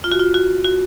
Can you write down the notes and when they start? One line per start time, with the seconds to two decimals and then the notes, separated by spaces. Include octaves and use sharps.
0.04 F4
0.12 F#4
0.19 F4
0.34 F#4
0.64 F#4